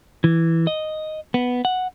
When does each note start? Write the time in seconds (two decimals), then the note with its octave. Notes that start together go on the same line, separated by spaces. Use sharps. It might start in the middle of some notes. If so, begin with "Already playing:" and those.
0.24 E3
0.67 D#5
1.34 B3
1.65 F#5